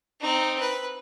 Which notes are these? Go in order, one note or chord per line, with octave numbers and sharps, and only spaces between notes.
C4 D#4
B4